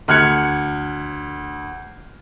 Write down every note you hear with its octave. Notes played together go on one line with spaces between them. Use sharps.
D2 F6 F#6 G#6 C#7